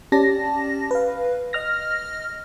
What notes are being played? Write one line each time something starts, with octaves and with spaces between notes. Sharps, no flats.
C#4 G4 D5 A5 A#6
B4 F5
D#5 F6 A#6